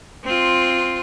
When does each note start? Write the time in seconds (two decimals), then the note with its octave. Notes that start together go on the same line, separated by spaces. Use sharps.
0.24 C4 F4